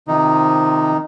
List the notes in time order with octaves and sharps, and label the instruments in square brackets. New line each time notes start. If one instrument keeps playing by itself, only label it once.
[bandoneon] C3 D#3 F3 D#4